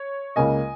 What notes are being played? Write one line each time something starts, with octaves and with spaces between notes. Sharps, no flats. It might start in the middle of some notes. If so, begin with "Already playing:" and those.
Already playing: C#5
C#2 C#3 A#3 D#5 G#5